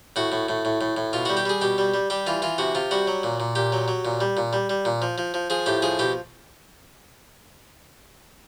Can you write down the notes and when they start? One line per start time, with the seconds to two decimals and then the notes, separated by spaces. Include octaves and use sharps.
0.16 A2 F#4
0.32 A2
0.49 A2
0.65 A2
0.81 A2
0.97 A2
1.13 B2 F4
1.25 G3 F#4
1.37 G4
1.45 G3 G#4
1.61 B2 G4
1.78 G3
1.94 G3
2.10 G3 G4
2.27 E3 F4
2.42 E3 F4
2.58 C3 F#4
2.75 C3 F4
2.91 G3 F#4
3.07 F#3
3.23 A#2
3.40 A#2
3.55 A#2 G4
3.72 F#3
3.88 F#3
4.05 A#2
4.21 G3
4.37 A#2
4.53 G3
4.70 G3
4.85 A#2
5.02 F3
5.18 F3
5.34 F3
5.50 F3 G#4
5.66 A2 G4
5.82 F3 G#4
5.99 B2 G4